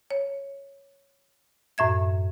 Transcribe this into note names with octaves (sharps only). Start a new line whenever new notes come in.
C#5
F#2 A2 E5 G#6